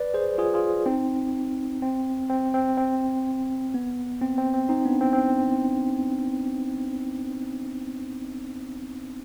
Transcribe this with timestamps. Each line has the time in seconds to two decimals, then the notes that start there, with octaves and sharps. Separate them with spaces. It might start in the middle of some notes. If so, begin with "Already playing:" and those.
Already playing: B4 D5
0.14 G#4 C5
0.38 F4 G#4
0.54 F4 G#4
0.86 C4 D#4
1.82 C4
2.29 C4
2.54 C4
2.77 C4
3.74 B3
4.21 C4
4.38 C4
4.54 C4
4.69 C4 D#4
4.85 B3 D4
5.01 C4
5.13 C4